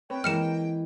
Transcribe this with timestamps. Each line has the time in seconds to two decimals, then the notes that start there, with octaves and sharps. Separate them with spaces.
0.10 C4 B4 C#5 G5
0.24 E3 G#3 A#3 A#4 D#5 F6 C#7 E7